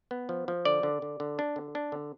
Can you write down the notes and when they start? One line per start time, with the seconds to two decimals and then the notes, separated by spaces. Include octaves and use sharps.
0.11 B3
0.29 F3
0.48 F3
0.65 D3 D5
0.83 D3
1.02 D3
1.20 D3
1.39 D4
1.56 D3
1.75 D4
1.92 D3